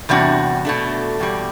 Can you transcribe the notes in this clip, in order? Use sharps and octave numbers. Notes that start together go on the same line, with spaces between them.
E2 C3 G3 D4 F#4
B2 A3 D4
E2 B2 G3